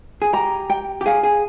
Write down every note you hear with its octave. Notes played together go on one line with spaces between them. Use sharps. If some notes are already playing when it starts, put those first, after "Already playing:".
G#4
G4 A#5
G5
G4
G#4 F5
G#4